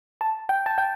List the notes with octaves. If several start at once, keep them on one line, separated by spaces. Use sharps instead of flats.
A5
G5
A5
G5